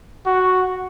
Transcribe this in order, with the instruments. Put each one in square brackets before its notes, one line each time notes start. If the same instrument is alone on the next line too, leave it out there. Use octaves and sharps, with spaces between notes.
[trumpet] F#4